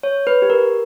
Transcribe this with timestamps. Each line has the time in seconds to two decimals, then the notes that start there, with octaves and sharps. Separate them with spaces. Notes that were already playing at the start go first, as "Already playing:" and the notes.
0.03 C#5
0.27 B4
0.42 G4
0.50 A#4